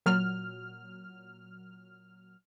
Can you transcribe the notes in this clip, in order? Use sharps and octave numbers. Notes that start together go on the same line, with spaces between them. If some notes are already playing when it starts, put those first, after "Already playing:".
A#2 F#3 F6